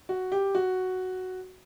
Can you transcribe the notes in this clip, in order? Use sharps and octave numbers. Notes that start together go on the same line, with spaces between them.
F#4
G4
F#4